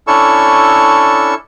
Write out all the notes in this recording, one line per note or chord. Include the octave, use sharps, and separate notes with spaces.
C#4 D4 E4 A4 C#6 E6